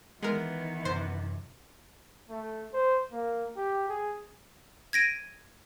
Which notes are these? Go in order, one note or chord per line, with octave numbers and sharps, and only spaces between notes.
D#3 E3 G#3 B3 A#4
F#2 C3 C5
A3
C5
A#3
G4
G#4
G#6 A#6 D7 D#7